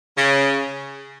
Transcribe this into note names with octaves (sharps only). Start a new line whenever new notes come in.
C#3